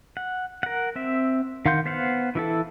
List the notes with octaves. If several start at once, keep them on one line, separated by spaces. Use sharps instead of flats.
F#5
A#4 F#5
C4 E5
D#3 F5 F#5 C6 G6
B3 C5 F5 F#5
E3 E4 A4